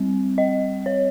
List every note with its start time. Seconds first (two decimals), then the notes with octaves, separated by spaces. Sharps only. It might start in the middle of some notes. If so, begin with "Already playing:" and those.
Already playing: G3 C4
0.38 D#5
0.86 C#5